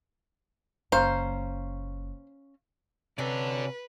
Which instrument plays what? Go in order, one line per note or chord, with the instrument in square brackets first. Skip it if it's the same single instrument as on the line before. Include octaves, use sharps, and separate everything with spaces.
[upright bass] F#1 A#3 [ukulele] C#4 F5 A#5 [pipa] C5
[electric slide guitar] C3 [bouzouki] F#3 C#4 [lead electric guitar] A4 D5 [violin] B4